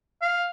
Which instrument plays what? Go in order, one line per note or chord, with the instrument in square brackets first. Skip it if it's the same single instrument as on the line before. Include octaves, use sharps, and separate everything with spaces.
[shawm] F5